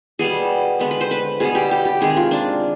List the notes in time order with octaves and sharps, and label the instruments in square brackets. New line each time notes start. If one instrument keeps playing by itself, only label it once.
[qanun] B2 G3 B3 G#4
D3 G#3 B3 B4
B4
C5
B4
B2 G3 B3 G#4
G4
G4
G4
C3 D#3 G#3 G#4
F4
D4